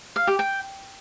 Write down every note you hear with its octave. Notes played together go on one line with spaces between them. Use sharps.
F5
G4
G5